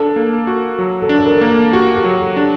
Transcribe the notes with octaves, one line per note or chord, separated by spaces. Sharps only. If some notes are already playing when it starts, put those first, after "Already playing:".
Already playing: D4 A4
A#3
F#4
F#3
A4
D4
A4
A#4
A#3
A4
F#4 G4
G4
F#3
A4
D4